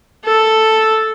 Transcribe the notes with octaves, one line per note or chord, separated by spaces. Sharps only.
A4